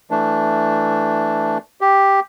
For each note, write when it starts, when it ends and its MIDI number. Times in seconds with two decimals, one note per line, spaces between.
0.11 1.58 52
0.11 1.58 57
0.11 1.58 62
1.81 2.20 67